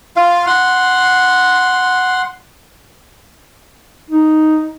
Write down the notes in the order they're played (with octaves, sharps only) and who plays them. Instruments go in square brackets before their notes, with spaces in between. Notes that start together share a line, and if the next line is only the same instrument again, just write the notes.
[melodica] F4 F5
F#5 C6
[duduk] D#4